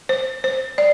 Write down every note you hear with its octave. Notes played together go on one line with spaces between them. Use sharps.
C5
C5
D5